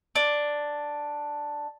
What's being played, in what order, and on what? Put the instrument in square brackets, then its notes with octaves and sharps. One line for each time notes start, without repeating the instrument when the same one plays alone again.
[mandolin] D4